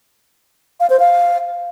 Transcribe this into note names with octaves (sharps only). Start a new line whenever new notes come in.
F5
C5
F5